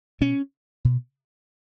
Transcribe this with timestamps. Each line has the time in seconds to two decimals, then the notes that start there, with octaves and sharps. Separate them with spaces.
0.21 B2 C#4
0.85 B2